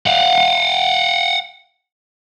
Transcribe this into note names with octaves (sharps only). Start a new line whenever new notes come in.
F5 F#5